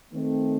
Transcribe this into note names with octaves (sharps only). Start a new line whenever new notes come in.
D#3 A3 C4